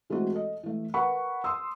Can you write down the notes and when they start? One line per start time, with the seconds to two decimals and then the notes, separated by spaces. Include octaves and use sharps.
0.10 E3 G#3 A3 C4 F#4
0.32 A4 D#5
0.63 E3 A3
0.94 A#4 B4 F#5 B5 C#6
1.44 C6 D#6 E6